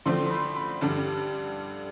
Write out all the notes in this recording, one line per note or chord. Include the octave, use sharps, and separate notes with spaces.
D3 F3 A3 C4 C6
C6
B5
B5
G2 D3 G3 D4 A5